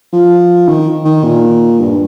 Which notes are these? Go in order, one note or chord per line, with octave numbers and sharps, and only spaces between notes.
F3
D#3
D#3
A#2
G2